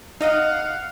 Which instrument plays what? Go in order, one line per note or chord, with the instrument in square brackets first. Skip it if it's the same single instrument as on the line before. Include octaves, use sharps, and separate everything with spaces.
[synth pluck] D#4 D#5 D#6 [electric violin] F5 F#5